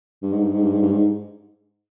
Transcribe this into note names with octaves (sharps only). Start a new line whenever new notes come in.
G2
G#2
G2
G#2
G2
G#2
G2
G#2